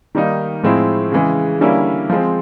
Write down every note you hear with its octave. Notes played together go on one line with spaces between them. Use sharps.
D#3 G3 A#3 D#4
A2 F3 G#3 C4 E4
C#3 E3 G#3
D3 G3 A#3 C#4 E4
F3 G#3 C4